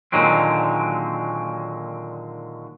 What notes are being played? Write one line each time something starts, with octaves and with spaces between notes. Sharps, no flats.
A#2 D3 D#3 F#3 G#3 C4